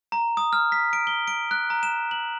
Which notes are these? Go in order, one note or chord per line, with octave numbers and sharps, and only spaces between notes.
A#5
D#6
F6
B6
D7
G7
D7
F#6
A#5
E7
F#7